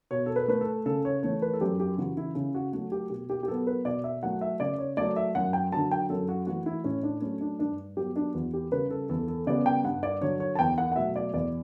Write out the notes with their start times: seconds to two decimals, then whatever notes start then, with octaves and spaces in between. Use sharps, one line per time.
0.11 B2 C#5
0.26 A4
0.36 B4
0.48 A3 B4
0.61 A4
0.86 C#3 A4
1.05 C#5
1.23 E3 A3 C#5
1.42 B4
1.53 A4
1.61 F#2 G4
1.80 G4
1.98 C#3 E3 F#4
2.17 E4
2.35 C#3 E4
2.55 F#4
2.73 F#3 A3 F#4
2.92 G4
3.10 B2 G4
3.30 G4
3.43 G4
3.48 F#3 B3 A4
3.67 B4
3.85 B2 D5
4.04 E5
4.23 F#3 A3 F#5
4.41 E5
4.60 C#3 D5
4.79 C#5
4.97 F#3 A3 D5
5.16 E5
5.35 F#2 F#5
5.53 G5
5.72 D3 F#3 A5
5.91 G5
6.10 F#2 A4
6.29 F#4
6.47 E3 A3 F#4
6.66 E4
6.84 A2 C#4
7.03 D4
7.22 F#3 A3 C#4
7.41 D4
7.59 G2 D4
7.97 F#3 B3 G4
8.16 D4
8.34 E2 F#4
8.53 G4
8.72 C#3 G3 B4
8.91 A4
9.09 E2 A4
9.28 A4
9.47 C#3 G3 B3 D5
9.66 G5
9.84 G2 F#5
10.03 D5
10.21 D3 F#3 C#5
10.40 C#5
10.55 A5
10.59 E2 G5
10.78 F#5
10.92 F#5
10.96 B2 F#3 A3 E5
11.16 D5
11.33 E2 D5